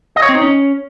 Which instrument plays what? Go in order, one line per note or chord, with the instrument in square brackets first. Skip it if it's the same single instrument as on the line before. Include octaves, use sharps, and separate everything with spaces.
[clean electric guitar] D#5
C#5
C4
D#4
C#4